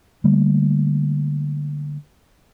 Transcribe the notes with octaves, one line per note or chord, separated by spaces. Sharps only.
D3 G3 A3 A#3